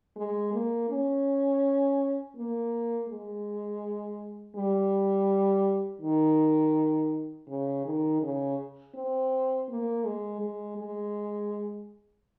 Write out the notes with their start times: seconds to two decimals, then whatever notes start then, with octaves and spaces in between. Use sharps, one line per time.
0.16 G#3
0.53 A#3
0.90 C#4
2.36 A#3
3.09 G#3
4.56 G3
6.01 D#3
7.48 C#3
7.85 D#3
8.22 C#3
8.95 C4
9.69 A#3
10.05 G#3
10.41 G#3
10.78 G#3